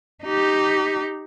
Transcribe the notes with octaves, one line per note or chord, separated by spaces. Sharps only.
D#4 G4